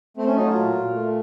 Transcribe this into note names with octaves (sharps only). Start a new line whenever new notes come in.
A3 C4
C#4
F#3 D#4
F4
A#2
A#2
A3